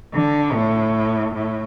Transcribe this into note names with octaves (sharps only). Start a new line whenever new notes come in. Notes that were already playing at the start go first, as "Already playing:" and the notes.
D3
A2
A2